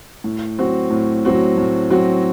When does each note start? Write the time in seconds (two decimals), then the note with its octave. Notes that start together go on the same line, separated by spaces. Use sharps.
0.24 A2
0.59 F#3 C4 F#4
0.91 A2
1.25 F#3 C4 F#4
1.58 A2
1.90 F#3 C4 F#4